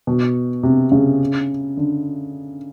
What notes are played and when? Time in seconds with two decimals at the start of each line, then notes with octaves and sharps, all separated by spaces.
0.07 B2
0.63 C3
0.92 C#3
1.77 D3